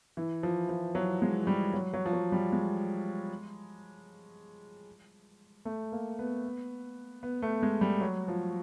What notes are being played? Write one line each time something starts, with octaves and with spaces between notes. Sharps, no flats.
E3
F3
F3
F#3
G#3
G3
F#3
F#3
F3
F#3
G3
G#3
A3
A#3
B3
B3
A3
G#3
G3
F#3
F3